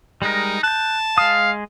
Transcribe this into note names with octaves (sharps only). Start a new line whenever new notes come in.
G3 G#3 D#4 A#4
A5 F#6 G6
G#3 F5 D#6